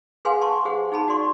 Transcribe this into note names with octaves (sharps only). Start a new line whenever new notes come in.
G#4 B4 F5 F#5 G#5 C6
A5 C6 C#6
G4 G#4 C5 F#5
D#4 G#4 A5 B5
F#4 D5 C6 C#6